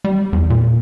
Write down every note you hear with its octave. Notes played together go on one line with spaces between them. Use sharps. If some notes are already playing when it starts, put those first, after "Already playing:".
G3
E2
A#2